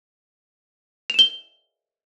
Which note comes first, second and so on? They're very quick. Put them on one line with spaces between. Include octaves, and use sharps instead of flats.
F7 E7 G7